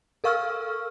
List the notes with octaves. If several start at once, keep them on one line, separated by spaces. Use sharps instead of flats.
A4 A#4 F5 C#6 E6 F6